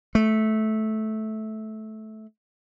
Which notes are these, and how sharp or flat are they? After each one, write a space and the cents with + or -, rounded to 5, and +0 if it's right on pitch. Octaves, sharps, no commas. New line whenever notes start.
A3 -15